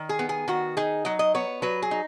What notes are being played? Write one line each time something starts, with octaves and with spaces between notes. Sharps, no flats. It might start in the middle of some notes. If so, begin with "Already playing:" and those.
Already playing: D#3
G#4
B3
G#4
D#3 F#4
D#4 G#4
F#3 D#5
D#5
B3 C#5
F#3 B4
G#4
D#4